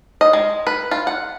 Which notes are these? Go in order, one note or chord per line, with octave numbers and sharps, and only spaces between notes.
D#5
G#3
B4
F4
F#5